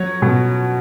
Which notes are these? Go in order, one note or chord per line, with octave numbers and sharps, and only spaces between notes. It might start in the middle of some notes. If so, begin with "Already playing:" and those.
Already playing: F#3 C#5
B2